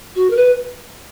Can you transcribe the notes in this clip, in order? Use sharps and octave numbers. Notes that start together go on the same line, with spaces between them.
F#4
A#4
B4